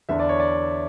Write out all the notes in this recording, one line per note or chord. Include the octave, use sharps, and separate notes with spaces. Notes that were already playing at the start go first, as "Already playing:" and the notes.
E2 D3 E5
D5
C#5
D5